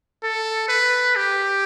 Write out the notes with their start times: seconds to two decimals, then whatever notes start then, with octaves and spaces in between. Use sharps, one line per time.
0.23 A4
0.69 B4
1.16 G4